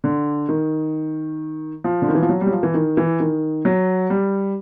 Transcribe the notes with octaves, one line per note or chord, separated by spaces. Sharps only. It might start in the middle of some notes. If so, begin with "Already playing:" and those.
D3
D#3
F3
D3
D#3
E3
F3
F#3
G3
F#3
F3
E3
D#3
E3
D#3
F#3
G3